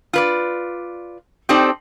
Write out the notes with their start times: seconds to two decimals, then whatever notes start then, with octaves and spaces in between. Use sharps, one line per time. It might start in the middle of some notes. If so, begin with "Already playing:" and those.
0.13 F4 B4 D5
1.49 C4 D#4 G4 A4 C5 D5